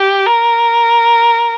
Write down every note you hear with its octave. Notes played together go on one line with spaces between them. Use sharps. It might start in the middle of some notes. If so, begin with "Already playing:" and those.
Already playing: G4
A#4